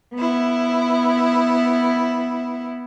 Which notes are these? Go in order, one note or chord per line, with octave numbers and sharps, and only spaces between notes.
B3 E4